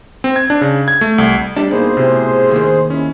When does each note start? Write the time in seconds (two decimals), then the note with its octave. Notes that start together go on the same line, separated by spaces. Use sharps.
0.24 C4
0.36 G#6
0.50 D4
0.61 C#3
0.88 G#6
1.01 A3
1.18 C2
1.57 G3 D4
1.71 B2 A#3 D#4 G#4 C5
1.97 A2 C3
2.51 D#2 D#3
2.90 C#4 E4